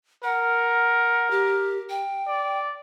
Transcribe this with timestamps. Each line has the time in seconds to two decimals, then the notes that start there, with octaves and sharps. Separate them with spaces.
0.24 A#4 F#5
1.31 G4
1.90 G5
2.27 D5